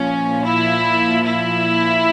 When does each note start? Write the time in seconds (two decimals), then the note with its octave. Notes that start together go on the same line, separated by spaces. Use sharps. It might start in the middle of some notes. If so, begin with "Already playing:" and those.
Already playing: A#2 F3 C#4
0.46 E4
1.24 E4